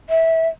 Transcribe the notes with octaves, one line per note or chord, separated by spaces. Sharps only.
E5